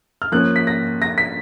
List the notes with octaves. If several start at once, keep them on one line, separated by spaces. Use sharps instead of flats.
F6
F3 A#3 C#4 F#6
B6
A#6
A#6
B6